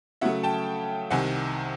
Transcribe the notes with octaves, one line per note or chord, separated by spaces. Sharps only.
C#3 F#3 A3 E5 F#5
G5 A5
C2 C3 D#3 F#5 G#5